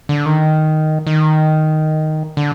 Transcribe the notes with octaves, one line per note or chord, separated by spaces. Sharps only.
D3
D#3
D#3
D3